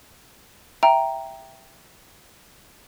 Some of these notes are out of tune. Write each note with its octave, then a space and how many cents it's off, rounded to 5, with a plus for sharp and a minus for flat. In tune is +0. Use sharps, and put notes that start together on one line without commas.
E5 +5 G5 +0 A#5 +0